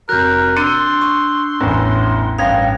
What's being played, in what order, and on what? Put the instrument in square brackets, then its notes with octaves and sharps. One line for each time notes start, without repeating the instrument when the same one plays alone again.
[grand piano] F1 F#3 [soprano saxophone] A#4 [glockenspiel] F#6 G6
[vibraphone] D4 E6 [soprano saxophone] C6 [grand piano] A6 C#7 D#7
[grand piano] C#6
A1 E2 A2
[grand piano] A1 G2 [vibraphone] F5 G5 [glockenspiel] D#6 G#6 A#6